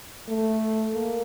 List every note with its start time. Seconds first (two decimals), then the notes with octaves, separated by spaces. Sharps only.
0.29 A3
0.93 A#3